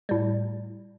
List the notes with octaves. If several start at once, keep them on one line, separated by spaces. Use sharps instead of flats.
A2 G3